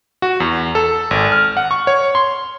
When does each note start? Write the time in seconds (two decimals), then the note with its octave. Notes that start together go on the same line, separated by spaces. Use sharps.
0.22 F#4
0.40 E2
0.75 A4
1.11 G#1
1.32 F6
1.57 F#5
1.71 C#6
1.87 C#5
2.15 C6